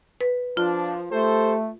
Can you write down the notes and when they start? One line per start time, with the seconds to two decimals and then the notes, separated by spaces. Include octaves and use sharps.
0.21 B4
0.57 F3 D4 F4
1.11 A3 G4 A4 C5